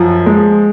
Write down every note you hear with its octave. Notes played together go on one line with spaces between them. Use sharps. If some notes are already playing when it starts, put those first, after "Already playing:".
Already playing: F#2 F3
G#3